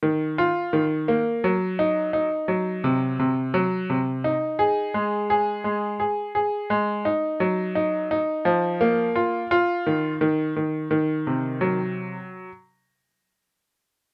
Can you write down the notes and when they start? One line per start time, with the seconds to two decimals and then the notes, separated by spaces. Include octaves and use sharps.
0.03 D#3
0.38 F4
0.73 D#3
1.08 A#3
1.44 F#3
1.79 D#4
2.13 D#4
2.48 F#3
2.84 C3
3.19 C3
3.54 F#3
3.90 C3
4.24 D#4
4.59 G#4
4.94 G#3
5.30 G#4
5.64 G#3
6.00 G#4
6.35 G#4
6.70 G#3
7.05 D#4
7.40 F#3
7.75 D#4
8.11 D#4
8.45 F3
8.81 A#3
9.16 F4
9.51 F4
9.86 D#3
10.21 D#3
10.56 D#3
10.91 D#3
11.27 C3
11.61 F#3